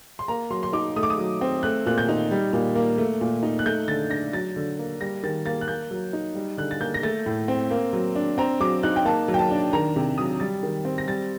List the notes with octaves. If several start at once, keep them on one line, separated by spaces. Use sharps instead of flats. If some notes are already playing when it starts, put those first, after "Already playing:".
C6
A#3 A#5
F#3 C6
C6
D#4 D6
A3 D#6
D6
D#6
F#3
C4
A3 F#6
A#2 F#6
G6
D#4
G3
A#2
A#3
A3
A#2
D#4
F#6
A3 G6
D3 A6
D4 A#6
F#3 A6
D3
A#3
G3 A#6
D#3 A6
A#3 A6
F#6
A#3 G6
F#3
D#4
G3
D3 F#6
A6
A#3 G6
A#6
A3 A6
A2
C4
A#3
F#3
D4
C4 A#5
F#3 D6
D#4 F#6
G5
A#3 A5
F#3
G5
A5
D4
D#3 A#5
C3
F#3 D#6
G3 A6
D#3
C4
A#6
G3 A6